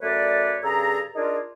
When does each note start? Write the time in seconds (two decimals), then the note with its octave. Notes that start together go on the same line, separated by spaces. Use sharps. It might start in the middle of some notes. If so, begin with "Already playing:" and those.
0.01 F#2 A3 B4 C#5 D5
0.63 G2 C#3 G#4 A4 A#5
1.15 D4 D#4 F4 G#4 A#4